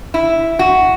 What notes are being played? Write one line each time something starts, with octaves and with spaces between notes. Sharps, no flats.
E4
F#4